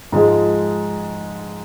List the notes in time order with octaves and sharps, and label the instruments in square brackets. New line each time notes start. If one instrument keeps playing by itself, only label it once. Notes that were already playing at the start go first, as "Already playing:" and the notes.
[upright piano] G#2 F3 G#3